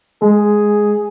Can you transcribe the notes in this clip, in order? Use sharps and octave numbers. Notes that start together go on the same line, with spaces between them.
G#3 G#4